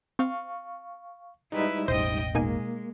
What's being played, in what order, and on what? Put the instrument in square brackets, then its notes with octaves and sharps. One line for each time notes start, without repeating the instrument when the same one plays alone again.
[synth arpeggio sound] C4 [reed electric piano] F5 C#6
[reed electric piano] G3 G#3 D#4 [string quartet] E4 B4 E5
[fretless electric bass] E1 A1 [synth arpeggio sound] C5 [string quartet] D#5 G5 D#6
[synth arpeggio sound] B2 D#4 G#5 [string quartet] G#3 [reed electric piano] A#3